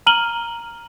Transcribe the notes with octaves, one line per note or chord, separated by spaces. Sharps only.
A#5 F6 D#7 F#7 G7